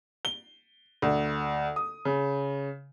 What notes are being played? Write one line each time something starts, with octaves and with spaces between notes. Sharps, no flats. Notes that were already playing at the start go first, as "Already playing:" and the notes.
G7
D2
D#6
C#3